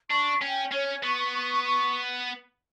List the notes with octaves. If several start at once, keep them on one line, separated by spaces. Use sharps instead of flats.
D4 C#6
C#4 G5
C#4 C#5
B3 C#6
C#6
C#6